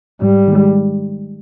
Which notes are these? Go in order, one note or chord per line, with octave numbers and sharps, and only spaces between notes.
G#2 G3
D#3
G#3